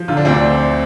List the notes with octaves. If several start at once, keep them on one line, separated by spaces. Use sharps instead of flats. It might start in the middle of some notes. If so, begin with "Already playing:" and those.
Already playing: F3
D3 F4
D4
D2 C4
D4